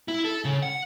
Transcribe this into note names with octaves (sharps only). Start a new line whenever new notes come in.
E4
A4
C#3
F#5